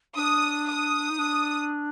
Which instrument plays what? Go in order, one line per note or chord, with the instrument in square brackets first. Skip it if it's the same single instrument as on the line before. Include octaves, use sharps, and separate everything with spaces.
[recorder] D4 [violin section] D#6
[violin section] D#6
[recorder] D#4
D4